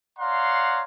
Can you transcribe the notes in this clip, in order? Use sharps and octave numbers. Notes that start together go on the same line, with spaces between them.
C#5 D5 F5 F#5 A#5 C6